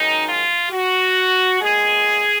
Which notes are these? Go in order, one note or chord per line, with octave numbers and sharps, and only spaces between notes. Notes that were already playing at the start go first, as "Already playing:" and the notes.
Already playing: F#2 D#3 G#3 D#4
F4
F#4
A#2 G#3 B3 G#4